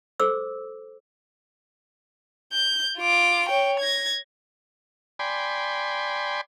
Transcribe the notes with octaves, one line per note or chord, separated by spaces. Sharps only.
A4 C5 D6 E6
G6
F4 D6
C#5 G5
G#6 A#6
D5 G5 G#5 B5 C6